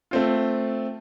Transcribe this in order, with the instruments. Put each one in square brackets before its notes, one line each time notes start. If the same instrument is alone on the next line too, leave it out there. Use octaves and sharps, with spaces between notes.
[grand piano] A3 C4 F4